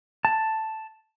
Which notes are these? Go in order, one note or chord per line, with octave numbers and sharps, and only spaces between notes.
A5